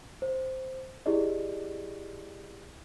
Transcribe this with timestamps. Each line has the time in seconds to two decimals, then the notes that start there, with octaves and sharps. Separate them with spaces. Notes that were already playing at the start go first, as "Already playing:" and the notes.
0.22 C5
1.06 E4 G4 G#4 D5 D#5